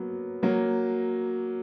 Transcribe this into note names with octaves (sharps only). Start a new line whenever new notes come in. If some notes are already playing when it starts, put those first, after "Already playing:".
Already playing: F#3 A#3 B3
F#3 A#3